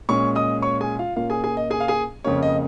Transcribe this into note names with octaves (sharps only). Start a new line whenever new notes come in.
A#2 G#3 C#4 C#5 C#6
D#5 D#6
C#5 C#6
G#4 G#5
F4 F5
A#2 A#3 C#4 F4 F5
G#4 G#5
G#4 G#5
D#5
G#4 G#5
F5
G#4 G#5
F2 C#3 A#3 C#4 C#5
D#5